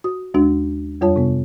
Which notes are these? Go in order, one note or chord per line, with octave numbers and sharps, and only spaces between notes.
F#4 D#6
D#2 G#3 D4 F#4
F2 G3 F4 C#5 A5
C3 B3